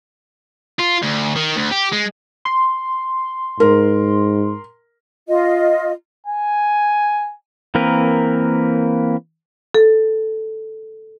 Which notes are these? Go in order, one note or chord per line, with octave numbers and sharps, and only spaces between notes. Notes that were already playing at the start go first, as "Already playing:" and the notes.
F4
D2
D#3
D2
G4
G#3
C6
G#2 A#4
F4 D#5
G#5
E3 A#3 C4 A#4 B4
A4